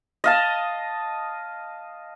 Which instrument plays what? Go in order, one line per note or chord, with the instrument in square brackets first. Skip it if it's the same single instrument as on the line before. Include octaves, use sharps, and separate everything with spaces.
[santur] D#5 F5 A5